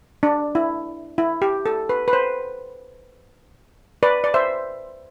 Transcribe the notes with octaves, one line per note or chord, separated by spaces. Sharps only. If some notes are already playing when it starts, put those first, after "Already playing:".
D4
E4
E4
G4
A4
B4
B4
C5
B4 D5
D5
C5 E5